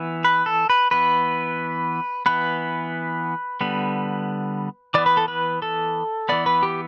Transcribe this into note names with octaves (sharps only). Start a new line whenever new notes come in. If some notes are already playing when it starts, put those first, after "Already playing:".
Already playing: E3 B3
B4
A4
B4
E3 B3 B4
E3 B3 B4
D3 G3 B3
E3 B3 D5
B4
A4
B4
A4
E3 B3 D5
B4
G4